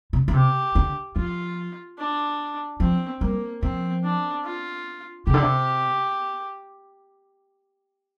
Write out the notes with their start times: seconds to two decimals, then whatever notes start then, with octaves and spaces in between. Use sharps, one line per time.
0.13 C3
0.28 D3
0.34 C3 G4
0.75 D3
1.16 F3 F4
1.98 D4
2.80 F3 C4
3.21 G3 A#3
3.63 F3 C4
4.04 D4
4.44 F4
5.27 C3 G4
5.34 D3
5.42 C3